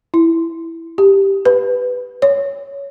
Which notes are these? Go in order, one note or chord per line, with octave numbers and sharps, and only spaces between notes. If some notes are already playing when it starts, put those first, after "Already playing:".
E4
G4
B4
C#5